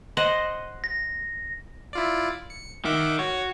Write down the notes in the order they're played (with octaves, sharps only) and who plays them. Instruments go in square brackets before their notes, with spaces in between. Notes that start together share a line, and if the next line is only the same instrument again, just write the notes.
[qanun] C5 D#5 F#5
[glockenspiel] A#6
[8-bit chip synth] E4 F4 D5
C#7
[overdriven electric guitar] D#3 [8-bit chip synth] E5 F#5 D6
[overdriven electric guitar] F#4 [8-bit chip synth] C#5